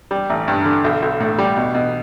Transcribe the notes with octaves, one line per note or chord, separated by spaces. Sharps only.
G3
A1
G2
D3
B1
B1
A2
G3
B2
B2